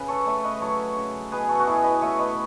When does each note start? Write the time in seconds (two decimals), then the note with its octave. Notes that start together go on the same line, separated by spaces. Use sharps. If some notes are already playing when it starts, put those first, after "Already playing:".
Already playing: C#3 B4
0.08 A4 C#5
0.26 A3 C#5 E5
0.44 B4 D#5
0.61 F#3 A4 C#5
0.96 C#3
1.31 B2 G#4 B4
1.49 F#4 A4
1.60 F#4
1.67 B2 E4 G#4
1.84 B4 D#5
2.01 A3 C#5 E5
2.19 B4 D#5